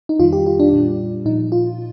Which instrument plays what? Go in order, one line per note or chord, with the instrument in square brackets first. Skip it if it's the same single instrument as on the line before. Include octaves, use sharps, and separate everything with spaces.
[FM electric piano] D#4
F2 D#3 G3 F4
G4
F4
D4
A#2 G3
A#2 F3 D#4
F4